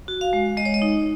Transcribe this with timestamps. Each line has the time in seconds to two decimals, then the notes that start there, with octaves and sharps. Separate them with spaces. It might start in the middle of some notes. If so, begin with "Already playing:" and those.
0.08 F#4
0.21 F5
0.33 G#3
0.57 G#3 D#5
0.65 C#5
0.74 D#5
0.82 D#4